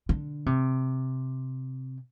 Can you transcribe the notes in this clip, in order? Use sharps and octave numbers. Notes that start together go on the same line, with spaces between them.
D3
C3